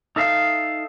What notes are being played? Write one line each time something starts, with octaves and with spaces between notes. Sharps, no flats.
D#4 A4 E5 F5